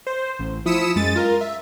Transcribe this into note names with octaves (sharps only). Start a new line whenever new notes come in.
C5
A1
F3 E4 D#6 B6 C#7 E7
F#2 G#3 A6 D#7
F4 A#4
E5